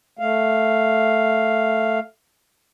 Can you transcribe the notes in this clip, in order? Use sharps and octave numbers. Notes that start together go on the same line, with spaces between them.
A3 F5